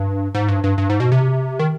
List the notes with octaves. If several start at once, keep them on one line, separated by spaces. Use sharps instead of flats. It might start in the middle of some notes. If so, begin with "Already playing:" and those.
Already playing: G2
G#2
G2
G2
G2
G#2
B2
C3
D#3